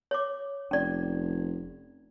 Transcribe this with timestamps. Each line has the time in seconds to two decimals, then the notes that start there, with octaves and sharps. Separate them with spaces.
0.11 C#5 D6
0.71 F1 C#4 D5